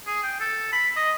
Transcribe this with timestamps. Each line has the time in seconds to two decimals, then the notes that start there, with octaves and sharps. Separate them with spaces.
0.07 G#4
0.23 G5
0.40 A4
0.73 B5
0.96 D#5